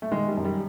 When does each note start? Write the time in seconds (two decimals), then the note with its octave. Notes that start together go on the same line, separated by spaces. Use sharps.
0.02 A3
0.11 D#3 G#3
0.28 G3
0.37 F#2
0.45 G3